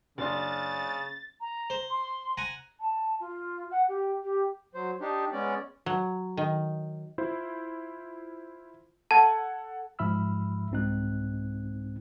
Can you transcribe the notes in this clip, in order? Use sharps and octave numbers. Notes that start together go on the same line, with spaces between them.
F#1 C#3 D4 C6 A6
A#5
C5
C6
F#5 G#5 A#5
A5
F4
F#5
G4
G4
F#3 C5
D4 D#4 G4
G#3 B3 C#4 D5
F#3
D#3
E4 F4 C5
A4 F#5 A5 G#6
G#2 F3 E5 B5 E6 F6
C2 G#2 C4 D#4 F#6